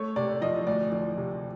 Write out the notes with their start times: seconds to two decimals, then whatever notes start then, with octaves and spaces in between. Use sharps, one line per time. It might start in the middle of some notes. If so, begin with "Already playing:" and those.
Already playing: A3 C#5
0.16 C3 D5
0.41 F3 D#5
0.67 D2 D5
0.92 F3
1.17 C3